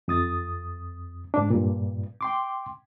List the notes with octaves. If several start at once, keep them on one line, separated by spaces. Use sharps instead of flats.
F2 D#6 A6
G#2 D4
G2 A#2
G5 C6 D6